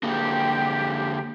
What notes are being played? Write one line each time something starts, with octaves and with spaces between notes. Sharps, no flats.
D3 A#3 G4 G#4